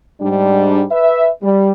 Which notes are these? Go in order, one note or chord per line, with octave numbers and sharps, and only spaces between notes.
G#2 G3 D4
B4 E5
G3